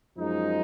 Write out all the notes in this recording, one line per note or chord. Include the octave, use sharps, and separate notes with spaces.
F#2 F3 G#3 D#4